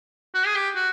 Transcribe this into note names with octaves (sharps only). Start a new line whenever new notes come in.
F#4
G#4
G4
F#4